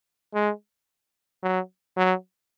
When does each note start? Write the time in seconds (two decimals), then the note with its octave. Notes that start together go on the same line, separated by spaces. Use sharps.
0.34 G#3
1.43 F#3
1.97 F#3